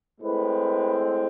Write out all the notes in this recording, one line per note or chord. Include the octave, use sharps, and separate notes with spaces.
A2 G#3 C4 B4